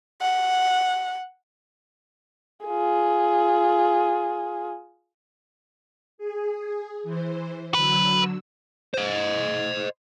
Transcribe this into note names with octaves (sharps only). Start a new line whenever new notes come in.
F#5
F4 G#4
G#4
E3 C5
D3 F#3 B4 E6
C5 D#5